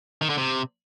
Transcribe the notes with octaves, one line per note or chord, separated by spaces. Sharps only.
D#3
D3
C3